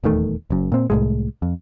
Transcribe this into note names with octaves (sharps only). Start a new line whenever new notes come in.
D#1 E2 D#3 A3
F#1 F#2
A#2 C4
C2 A2 G#3
F2